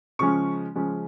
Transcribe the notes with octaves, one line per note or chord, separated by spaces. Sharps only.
C#3 F3 G#3 C#4 C#6
C#3 F3 G#3 C#4